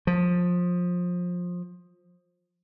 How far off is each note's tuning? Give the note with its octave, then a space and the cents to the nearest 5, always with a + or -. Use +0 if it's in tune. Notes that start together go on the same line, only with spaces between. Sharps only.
F3 +20